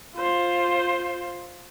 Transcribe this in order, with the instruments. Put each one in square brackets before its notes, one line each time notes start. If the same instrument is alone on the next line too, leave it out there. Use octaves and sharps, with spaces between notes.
[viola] F4 C5